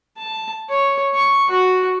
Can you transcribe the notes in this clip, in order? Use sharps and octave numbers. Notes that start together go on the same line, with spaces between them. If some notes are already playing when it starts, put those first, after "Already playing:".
A5
C#5
C#6
F#4